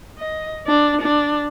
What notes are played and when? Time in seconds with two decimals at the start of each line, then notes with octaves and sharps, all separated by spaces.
0.18 D#5
0.67 D4
1.01 D4